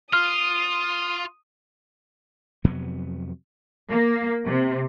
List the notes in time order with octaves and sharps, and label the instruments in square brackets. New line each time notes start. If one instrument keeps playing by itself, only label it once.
[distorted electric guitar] F4 [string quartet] D#6 [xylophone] F6
[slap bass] F2 C3 F#3 B3
[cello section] A#3
C3